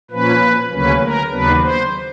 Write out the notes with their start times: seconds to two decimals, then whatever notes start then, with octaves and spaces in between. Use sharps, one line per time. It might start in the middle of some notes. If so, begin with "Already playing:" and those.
0.11 A#2 F3 A#3 C#4 B4
0.71 D2 C#3 F#3 A#3 C#4 B4
1.02 A#4
1.31 D#2 C#3 F#3 B3 D4 B4
1.61 C5